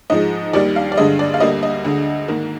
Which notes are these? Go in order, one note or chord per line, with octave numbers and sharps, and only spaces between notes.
G#2 F3 G#3 D#5
D#2 D#3 G3 D5
F5
D5
G2 D3 G#3 D#5
D5
F5
D2 D3 G3 A#3 D#5
D#5
D2 D3 G#3
G#2 D#3 A#3